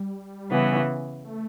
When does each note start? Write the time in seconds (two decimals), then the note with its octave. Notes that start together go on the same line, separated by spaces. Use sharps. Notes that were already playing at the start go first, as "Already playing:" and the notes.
Already playing: G3
0.50 C#3 E3 B3
1.24 A3